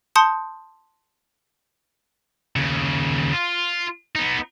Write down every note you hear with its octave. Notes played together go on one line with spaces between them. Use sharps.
A5 C6 D#6 G6 C#7 G7
D#2 C#3
F4
B3 D#4